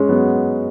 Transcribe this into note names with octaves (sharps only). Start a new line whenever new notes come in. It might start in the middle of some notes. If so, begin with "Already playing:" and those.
Already playing: G#3 C#4
F#3 B3